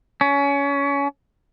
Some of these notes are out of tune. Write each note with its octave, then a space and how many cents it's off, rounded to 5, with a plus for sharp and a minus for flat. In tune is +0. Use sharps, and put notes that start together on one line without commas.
C#4 +25